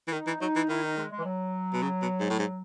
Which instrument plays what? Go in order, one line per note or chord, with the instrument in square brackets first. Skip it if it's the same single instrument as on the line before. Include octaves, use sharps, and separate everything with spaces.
[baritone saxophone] E3
[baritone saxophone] D#3 [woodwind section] D#4
[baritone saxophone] E3
[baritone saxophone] F#3 [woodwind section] D#4
[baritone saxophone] E3
[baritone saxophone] D#3 [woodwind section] E4
[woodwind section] D#4
G#3
G#3
E3
F#3
[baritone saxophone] B2
C#3
B2
G#2
A2
G#2